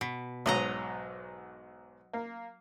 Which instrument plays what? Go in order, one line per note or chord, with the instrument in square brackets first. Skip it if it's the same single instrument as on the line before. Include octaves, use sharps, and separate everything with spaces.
[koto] B2
[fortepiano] B1 G#2 [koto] F#3 D#5 A#5
[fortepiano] A#3